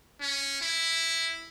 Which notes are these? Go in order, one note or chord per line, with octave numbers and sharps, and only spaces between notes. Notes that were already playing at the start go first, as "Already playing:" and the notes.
C#4
E4